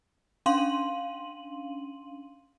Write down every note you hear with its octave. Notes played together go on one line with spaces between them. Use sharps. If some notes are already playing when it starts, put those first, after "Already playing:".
C#4 D4 F5 C6 D#7 F#7